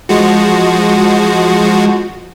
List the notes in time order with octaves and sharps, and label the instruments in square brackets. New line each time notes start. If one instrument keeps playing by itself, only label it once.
[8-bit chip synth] F3 G#3 F#4